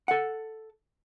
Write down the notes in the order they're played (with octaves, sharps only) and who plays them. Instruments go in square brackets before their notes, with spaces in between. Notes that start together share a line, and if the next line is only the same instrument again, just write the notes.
[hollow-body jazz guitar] A4 F#5